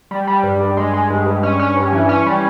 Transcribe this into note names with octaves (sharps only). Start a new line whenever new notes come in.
G3
G3
G2
G2
G#3
G#3
G2
G2
C#4
C#4
G2
E3
C#4
G3